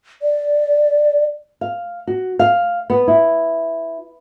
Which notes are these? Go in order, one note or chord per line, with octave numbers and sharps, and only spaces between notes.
D5
F5
F#4
F5
B3
E4